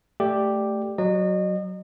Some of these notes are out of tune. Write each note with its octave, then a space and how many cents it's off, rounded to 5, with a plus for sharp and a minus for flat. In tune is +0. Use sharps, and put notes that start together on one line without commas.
A3 +0 G4 +0 D5 +10
F#3 +0 D#5 -35